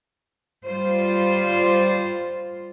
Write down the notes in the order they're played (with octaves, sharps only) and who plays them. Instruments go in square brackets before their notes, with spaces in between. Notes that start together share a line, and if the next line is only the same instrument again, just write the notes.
[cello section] G3 F4 C5